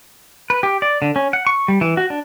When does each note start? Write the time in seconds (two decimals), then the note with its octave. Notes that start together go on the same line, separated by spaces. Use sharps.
0.50 B4
0.63 G4
0.82 D5
1.02 D3
1.16 C#4
1.33 F#5
1.47 C#6
1.68 G3
1.81 E3
1.97 F#4
2.10 D4